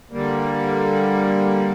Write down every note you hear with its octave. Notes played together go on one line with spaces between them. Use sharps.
D3 G3 A#3